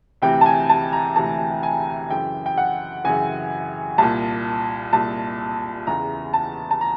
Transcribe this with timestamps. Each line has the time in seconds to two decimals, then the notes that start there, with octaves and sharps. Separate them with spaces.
0.22 D2 C3 E3 G5
0.41 A5
0.46 G#5
0.69 A5
0.93 A#5
1.16 D2 C3 E3 A5
1.63 G#5
2.10 F#2 C#3 E3 G5
2.46 G5
2.58 F#5
3.04 F#2 C#3 E3 G#5
3.98 C2 A#2 A5
4.93 C2 A#2 A5
5.87 E2 C#3 E3 A#5
6.34 A5
6.71 A5
6.81 A#5